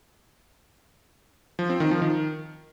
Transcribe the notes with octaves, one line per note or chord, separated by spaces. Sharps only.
F3
C4
D#3
F3
D#3